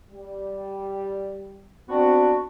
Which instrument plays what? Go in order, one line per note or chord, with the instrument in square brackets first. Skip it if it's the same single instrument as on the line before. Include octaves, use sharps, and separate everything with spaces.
[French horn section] G3
[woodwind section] B3 D4 F#4 [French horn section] C4